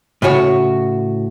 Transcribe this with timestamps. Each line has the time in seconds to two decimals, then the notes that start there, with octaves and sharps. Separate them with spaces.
0.22 A2 C#3 F#4 C#5